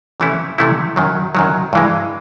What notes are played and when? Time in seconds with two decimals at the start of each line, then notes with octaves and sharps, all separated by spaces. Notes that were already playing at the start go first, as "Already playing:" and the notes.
0.20 C3 E3 A3 C#4 E4
0.58 C3 E3 A3 C#4 E4
0.96 F#2 D#3 F#3
1.35 F#2 D#3 F#3
1.73 G2 E3 G#3